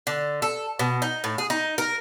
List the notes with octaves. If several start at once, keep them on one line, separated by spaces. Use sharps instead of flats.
D3
A4
B2
D#4
A2
G#4
D#4
A#4